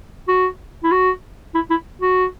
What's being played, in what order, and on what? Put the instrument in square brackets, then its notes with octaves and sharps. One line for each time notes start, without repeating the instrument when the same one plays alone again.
[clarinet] F#4
E4
F#4
E4
E4
F#4